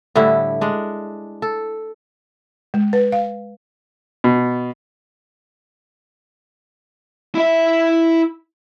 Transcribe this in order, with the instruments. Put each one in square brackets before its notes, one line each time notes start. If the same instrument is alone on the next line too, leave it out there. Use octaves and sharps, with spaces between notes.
[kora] A2 D3 G3 E4
G#3 D4
A4
[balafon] G#3
B4
F5
[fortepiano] B2
[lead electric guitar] E4 E5